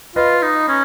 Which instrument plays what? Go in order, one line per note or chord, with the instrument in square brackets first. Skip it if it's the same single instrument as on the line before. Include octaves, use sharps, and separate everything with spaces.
[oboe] F4 [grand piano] B4 D#5
[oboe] D#4
C#4